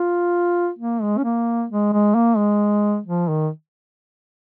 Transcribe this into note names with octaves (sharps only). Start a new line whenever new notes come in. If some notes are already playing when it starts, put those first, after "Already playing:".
Already playing: F4
A#3
G#3
C#4
A#3
G#3
G#3
A#3
G#3
F3
D#3